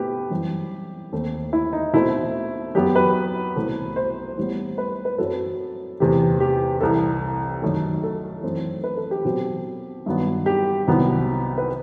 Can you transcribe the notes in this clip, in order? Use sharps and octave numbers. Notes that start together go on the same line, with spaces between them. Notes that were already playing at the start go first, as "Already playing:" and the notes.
Already playing: B2 A3 C4 G4 B4
F#2 E3 G3 C4
D#2 D#3 A3 C4
E4
D#4
B2 A3 C4 E4
F#2 F#3 B3 G4
B4
C2 B2 A3 C4
C5
A2 G3 B3
B4
B4
F#2 F#3 C4 A4
E2 C3 E3 A3 G4
G4
C2 C3 E3 A4
F#2 D#3 A3
A4
F#2 E3 A3 C4
B4
A4
G4
B2 F#3 C4
G2 D#3 F#3 B3
G4
C2 C3 D#3 F#3 B3
B4